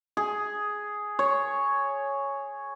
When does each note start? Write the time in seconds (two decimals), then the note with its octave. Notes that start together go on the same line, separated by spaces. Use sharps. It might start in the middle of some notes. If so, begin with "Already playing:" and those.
0.17 G#4
1.19 C#5